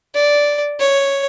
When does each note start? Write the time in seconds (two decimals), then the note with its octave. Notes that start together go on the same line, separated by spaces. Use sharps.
0.15 D5
0.80 C#5